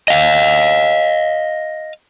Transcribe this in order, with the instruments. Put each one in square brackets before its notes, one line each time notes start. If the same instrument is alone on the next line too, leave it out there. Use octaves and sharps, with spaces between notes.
[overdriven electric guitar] D#5 F5